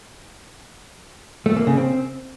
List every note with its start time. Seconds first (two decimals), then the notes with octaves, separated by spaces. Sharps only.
1.46 A3
1.56 A#3
1.67 C#3
1.77 C4